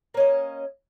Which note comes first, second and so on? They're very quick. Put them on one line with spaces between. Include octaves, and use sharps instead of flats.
A#3 C#4 D#5